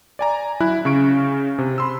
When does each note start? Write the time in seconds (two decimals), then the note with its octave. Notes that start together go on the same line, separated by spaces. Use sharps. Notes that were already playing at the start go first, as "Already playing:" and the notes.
0.19 D5 G#5 A#5
0.60 F#3 E4 F#6
0.85 C#3 C#4 C#6 D7
1.58 C3
1.78 B5 C6 E6